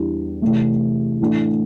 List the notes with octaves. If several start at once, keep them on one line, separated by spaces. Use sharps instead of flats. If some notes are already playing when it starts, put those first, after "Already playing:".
Already playing: E2 E3 G3 D4 G4
C3 E3 A3
A2 E3 A3 D4